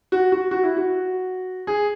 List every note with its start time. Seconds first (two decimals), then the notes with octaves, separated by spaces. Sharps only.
0.12 F#4
0.32 F#4
0.51 F#4
0.64 E4
0.77 F#4
1.67 G#4